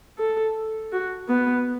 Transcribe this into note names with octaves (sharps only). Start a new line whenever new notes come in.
A4
F#4
B3